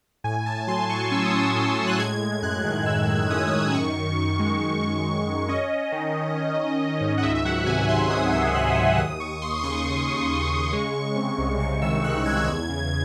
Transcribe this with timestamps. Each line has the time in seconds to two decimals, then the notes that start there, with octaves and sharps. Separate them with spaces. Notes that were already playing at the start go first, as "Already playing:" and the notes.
0.24 A2 G#5
0.46 A2 A5
0.67 F#3 C6
0.89 F#3 C#6
1.11 C#4 E6
1.25 D#6
1.34 A2
1.39 E6
1.55 A2
1.62 D#6
1.75 A2 E6
1.87 F#6
1.99 G#3 G#6
2.20 G#3
2.42 F#2 F#6
2.65 D#3
2.86 F#2 E6
3.08 D#3
3.30 C#4 D#6
3.52 D#3
3.73 F#2 C#6
3.96 F#2
4.17 D#3
4.39 G#3
4.61 F#2
4.83 D#3
5.05 F#2
5.27 F#2
5.48 C#4 D#5
5.71 C#4
5.92 D#3
6.14 D#3
6.36 C#4
6.58 D#3
6.80 D#3
7.01 G#2
7.18 F#5
7.23 C#2 E5
7.35 E5
7.45 F#3 F#5
7.66 C3 G#5
7.88 C#2 C6
8.10 F#3 D#6
8.32 F#3 E6
8.55 C3 F#6
8.76 C#2 E6
8.98 D#2 D#6
9.20 D#2 C#6
9.42 D#2 C6
9.57 D#6
9.63 C#3 C#6
9.85 D#2
10.07 D#2
10.29 D#2
10.51 C#3
10.73 G#3
10.94 G#3
11.16 C3
11.38 C2
11.60 C3 C#6
11.82 D#3 E6
12.04 D#3 F#6
12.26 G#3 G#6
12.47 E2
12.69 C#3